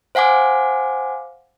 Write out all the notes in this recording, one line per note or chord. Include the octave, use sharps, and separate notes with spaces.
C5 F5 F#5 G#5 D6